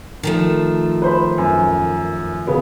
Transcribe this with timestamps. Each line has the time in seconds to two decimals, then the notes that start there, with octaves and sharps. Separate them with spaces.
0.23 D#3 F3 A3
1.02 B4 C5 B5
1.38 F#2
2.47 C#3 B3